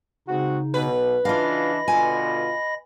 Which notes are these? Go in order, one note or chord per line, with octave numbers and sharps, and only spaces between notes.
C#3 G#3 C4 D#4 F#4
B1 B2 B4
C#3 E3 D4 F4 D#5 F5 B5 A#6
B2 D3 F4 G#5